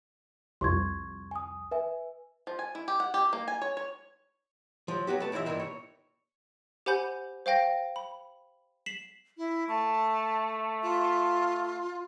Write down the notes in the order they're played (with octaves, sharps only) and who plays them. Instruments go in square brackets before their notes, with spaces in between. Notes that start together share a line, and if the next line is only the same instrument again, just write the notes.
[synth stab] C2 F2 [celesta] C6 C#6 G#6
[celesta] G#5 D#6
B4 E5 G#5
[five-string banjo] F3
G#5
E4
G4
F#5
G4
A#3
G#5
C#5
C#5
[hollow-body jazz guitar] F3 F#3
F#3 B3 F#4 G4
A3 B4 A5
B1 E3 F3 C5 E5
G2 A#2 D#3 E3 D4 E4
C#5
[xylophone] G4 C5 F#5 G#5 B5 G6
C5 F5 G5 A#6
B5
B6 C7 E7 F#7
[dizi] E4
[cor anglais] A3 [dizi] A5
[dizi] F4